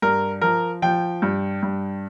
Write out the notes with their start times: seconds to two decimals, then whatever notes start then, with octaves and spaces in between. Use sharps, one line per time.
0.02 G2 A#4
0.41 F3 A#4
0.82 F3 G5
1.22 G2
1.62 G2